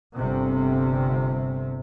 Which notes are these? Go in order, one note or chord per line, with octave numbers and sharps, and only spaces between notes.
G1 C3